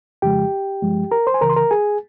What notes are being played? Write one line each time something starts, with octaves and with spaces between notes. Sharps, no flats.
F2 C#3 F3 G#3 G4 G5
G2 F3 G#3
A#4 A#5
C5 C6
G#5
C#2 C#3 E3 A#4 A#5
C6
A#4 A#5
G#4 G#5